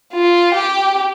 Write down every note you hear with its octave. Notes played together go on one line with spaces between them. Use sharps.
F4
G4